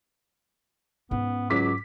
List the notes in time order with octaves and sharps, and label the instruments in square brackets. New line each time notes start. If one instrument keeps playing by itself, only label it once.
[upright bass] G#2 C#4 [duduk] B3
[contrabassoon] C#2 [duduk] F#3 [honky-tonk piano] D6 B6